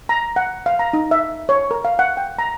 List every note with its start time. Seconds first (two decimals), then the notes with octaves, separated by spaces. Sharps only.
0.09 A#5
0.36 F#5
0.66 F5
0.79 A#5
0.93 D#4
1.11 E5
1.49 C#5
1.71 A#4
1.85 F5
1.99 F#5
2.17 G5
2.39 A#5